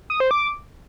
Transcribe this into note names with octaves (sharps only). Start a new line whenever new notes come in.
D#6
C5
D6